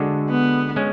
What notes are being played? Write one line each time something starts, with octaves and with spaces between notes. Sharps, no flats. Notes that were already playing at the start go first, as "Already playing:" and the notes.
Already playing: D3 G#3 D4 F#4 A4
B3
G#3 C#4